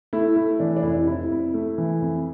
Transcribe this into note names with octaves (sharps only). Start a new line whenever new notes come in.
A3 E4
A3 E4
E3 D4
D4
F1 E4
F2 E4
F2
A3
E3
F2